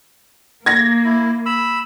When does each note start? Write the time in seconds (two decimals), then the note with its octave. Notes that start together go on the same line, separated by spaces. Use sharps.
0.66 A#3 G#6 A#6
1.05 E4
1.46 B5 E6